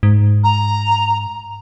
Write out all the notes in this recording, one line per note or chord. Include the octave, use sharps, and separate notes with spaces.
G#2
A#5